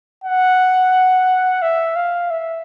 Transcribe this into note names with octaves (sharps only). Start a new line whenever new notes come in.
F#5
E5
F5
E5